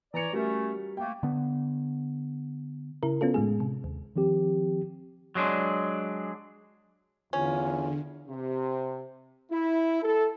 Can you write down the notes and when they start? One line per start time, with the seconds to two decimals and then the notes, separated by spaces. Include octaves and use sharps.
0.14 E3 C#5 D5 A#5 C#7
0.33 G3 A3 C#4 F#4 A#4
0.97 A3 A#3 G5
1.23 D3 B3
3.03 C#3 E4 A#4
3.21 B3 C#4 F4 A4
3.34 A2 G#3 G#4
3.60 C3
3.84 D#2
4.16 D#3 F3 C4 G4
5.35 F#3 G#3 D4
7.33 E2 D3 C#4 F4
8.28 C3
9.51 E4
10.02 A4